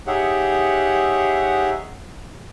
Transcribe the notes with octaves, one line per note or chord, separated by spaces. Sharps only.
D#4 G4 G#4 C#5 E5 F#5